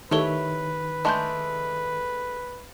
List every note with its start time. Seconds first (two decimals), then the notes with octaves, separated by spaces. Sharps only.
0.11 D#3 A3 E4 G4 A4 B4 C#5 G7
1.05 G#3 A3 D4 A5 C6 G6